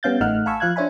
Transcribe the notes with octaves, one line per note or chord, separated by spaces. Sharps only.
G3 B3 C#4 F5 G6 A6
A1 A3 D#4 F#5 F6 F#6
F5 G#5 A5 B5 C#6 E6
F3 F5 F#6 G#6
D4 C5 C#5 E5 G#5 B5